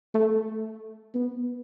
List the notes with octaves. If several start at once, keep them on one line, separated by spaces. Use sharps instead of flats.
A3
B3